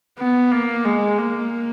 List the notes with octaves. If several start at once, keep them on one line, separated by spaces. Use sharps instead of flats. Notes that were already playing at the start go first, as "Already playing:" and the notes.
B3
A#3
G#3
A#3